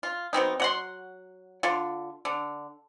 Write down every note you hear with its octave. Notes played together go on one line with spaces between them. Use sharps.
F4
F#3 B3 C4 D#4
F#3 F#5 C6
D3 F4
D3